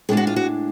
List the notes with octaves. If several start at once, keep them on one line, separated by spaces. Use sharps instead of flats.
A2 G#3 D4 F4 G#4
F#4
F4
F#4